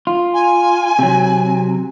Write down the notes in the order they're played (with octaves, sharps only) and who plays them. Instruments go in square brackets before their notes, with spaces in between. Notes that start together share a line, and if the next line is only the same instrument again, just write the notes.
[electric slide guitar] F4
[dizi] G#5
[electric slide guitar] C3 F#3